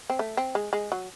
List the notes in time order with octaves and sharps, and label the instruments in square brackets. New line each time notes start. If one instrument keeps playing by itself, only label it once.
[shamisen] C4
A3
C4
G#3
G#3
F#3